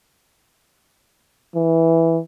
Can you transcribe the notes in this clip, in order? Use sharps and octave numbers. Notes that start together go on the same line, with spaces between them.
E3